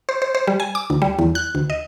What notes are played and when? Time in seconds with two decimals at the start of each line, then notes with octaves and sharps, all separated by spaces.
0.09 C5
0.22 C5
0.35 C5
0.47 G3
0.60 G#5
0.75 D6
0.90 D2
1.02 G3
1.19 E2
1.35 F#6
1.55 D2
1.70 D#5